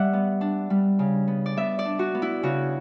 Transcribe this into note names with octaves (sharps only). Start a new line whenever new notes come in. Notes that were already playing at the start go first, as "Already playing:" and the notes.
Already playing: G3 D5 E5 F#5
B3
D4
G3
C#3
B3
D5
B3 E5
D5
D4
F#4
B3
E4
C#3 F#4